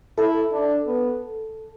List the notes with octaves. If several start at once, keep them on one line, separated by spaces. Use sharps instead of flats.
E4 A4
D4
B3